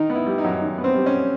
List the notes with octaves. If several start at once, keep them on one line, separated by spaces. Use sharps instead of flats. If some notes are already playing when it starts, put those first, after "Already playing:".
Already playing: D#3 D#4
B3
E4
G3
D#4
F#2
D#3
B3
C4
G3
C#4